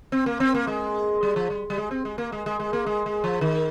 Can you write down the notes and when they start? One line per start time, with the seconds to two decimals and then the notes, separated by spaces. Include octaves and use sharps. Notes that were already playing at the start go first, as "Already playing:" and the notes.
0.12 C4
0.26 A#3
0.40 C4
0.54 A#3
0.67 G#3
1.23 G3
1.36 F3
1.50 G3
1.70 G3
1.78 G#3
1.91 C4
2.05 G#3
2.18 A#3
2.32 G#3
2.46 G#3
2.60 G#3
2.73 A#3
2.86 G#3
3.06 G#3
3.24 F3
3.41 D#3